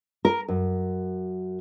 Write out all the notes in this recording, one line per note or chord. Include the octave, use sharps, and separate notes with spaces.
A#4
F#2